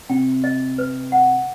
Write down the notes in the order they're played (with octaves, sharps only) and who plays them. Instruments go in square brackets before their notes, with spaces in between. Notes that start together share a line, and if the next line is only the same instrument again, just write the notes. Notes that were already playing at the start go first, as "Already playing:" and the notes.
[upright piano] C3 [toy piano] G5
[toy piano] D#5
B4
F#5